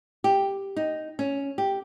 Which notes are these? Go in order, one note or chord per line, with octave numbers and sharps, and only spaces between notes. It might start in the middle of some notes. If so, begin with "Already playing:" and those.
G4
D#4
C#4
G4